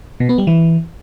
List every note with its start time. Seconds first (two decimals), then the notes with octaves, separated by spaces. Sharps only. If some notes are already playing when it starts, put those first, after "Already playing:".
0.20 B2
0.29 B3
0.38 G3
0.47 E3